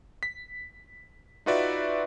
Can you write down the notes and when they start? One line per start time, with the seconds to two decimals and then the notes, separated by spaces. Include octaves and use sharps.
0.23 B6
1.46 D#4 F4 F#4 B4 D5 E5